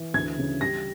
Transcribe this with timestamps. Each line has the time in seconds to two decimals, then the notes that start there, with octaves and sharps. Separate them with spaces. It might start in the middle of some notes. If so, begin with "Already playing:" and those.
Already playing: E3
0.14 D2 G#6
0.38 C#3
0.60 G3 A#6